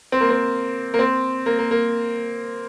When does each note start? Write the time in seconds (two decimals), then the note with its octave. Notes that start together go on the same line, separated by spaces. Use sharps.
0.12 C4
0.21 A#3
0.30 C4
0.94 A#3
0.99 C4
1.46 A#3
1.59 A#3
1.71 A#3